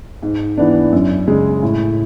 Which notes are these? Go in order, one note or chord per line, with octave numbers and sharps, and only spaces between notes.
G#2
E3 B3 D4
F#2
C#3 G#3
A2